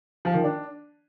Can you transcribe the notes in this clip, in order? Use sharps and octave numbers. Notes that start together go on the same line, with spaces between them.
F3
D#3
D4